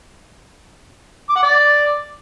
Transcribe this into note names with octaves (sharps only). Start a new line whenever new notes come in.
D6
F#5
D5